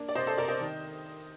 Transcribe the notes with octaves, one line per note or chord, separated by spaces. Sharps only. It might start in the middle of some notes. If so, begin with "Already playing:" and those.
Already playing: A#3 D4
D5
C3 C5 D#5
A4 C5
C3 A#4 D5
C5 D#5
D#3